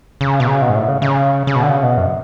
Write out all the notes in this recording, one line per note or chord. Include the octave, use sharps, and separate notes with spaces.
C#3
B2
C#3
B2
G#2
A2
C#3
C#3
C#3
B2
D3
C#3
B2
F#2